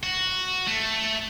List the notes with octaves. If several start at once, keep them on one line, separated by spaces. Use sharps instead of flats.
F#4
A3